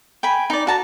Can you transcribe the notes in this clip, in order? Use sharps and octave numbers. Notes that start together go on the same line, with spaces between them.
G5 G#5 B5
D#4 D5
F#4 A5 A#5